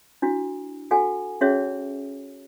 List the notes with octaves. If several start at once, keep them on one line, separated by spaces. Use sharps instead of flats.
D4 E4 F#4
F#4 A4 F#5 G#5
C#4 F#4 G#4 C#5 E5